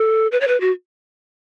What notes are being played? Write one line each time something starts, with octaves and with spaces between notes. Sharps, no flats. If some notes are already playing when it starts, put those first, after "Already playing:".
Already playing: A4
B4
C#5
B4
F#4